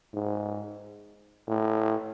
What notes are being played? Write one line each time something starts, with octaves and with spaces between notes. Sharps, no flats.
G#2
A2